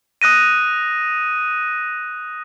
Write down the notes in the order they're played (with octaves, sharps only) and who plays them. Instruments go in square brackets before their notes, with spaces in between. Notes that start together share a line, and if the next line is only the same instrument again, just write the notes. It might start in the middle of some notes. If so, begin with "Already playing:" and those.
[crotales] D#6 F#6 A#6 D#7